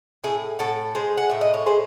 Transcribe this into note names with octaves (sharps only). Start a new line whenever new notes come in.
A2 E4 G#4
A2 F#4 A4
G#3 G#4 C5
F#5
A2 E5
D#5
C#5
A2 G#4 C5